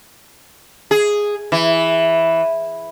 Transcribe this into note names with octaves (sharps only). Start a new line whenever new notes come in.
G#4
E3